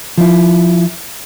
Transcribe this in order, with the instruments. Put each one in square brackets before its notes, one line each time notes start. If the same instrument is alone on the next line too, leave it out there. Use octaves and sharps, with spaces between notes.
[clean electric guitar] F3 E4